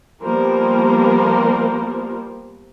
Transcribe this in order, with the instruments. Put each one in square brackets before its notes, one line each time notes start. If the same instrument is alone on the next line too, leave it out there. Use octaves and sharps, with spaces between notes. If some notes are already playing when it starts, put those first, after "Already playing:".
[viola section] F3 G3 A#3 B3 A#4 C5